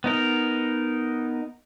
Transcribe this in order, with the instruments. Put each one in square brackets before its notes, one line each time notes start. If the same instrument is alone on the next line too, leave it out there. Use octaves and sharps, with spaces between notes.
[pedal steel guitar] B3 D#4 A#4